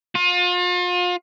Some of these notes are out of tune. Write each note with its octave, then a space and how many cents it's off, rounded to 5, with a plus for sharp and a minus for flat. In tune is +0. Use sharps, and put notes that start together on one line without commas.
F4 +35